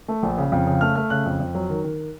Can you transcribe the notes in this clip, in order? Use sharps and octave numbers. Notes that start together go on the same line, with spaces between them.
A3
A#1
C#3
F2
C#3
A3 F6
A3 F6
C#3 F#6
F2
F2
F#3
D#3
D#3